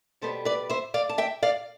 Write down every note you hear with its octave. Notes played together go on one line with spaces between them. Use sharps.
B2 G3 B3 A4 C5
B4 D5
C5 E5
D5 F5
A5
E5 G5
D5 F5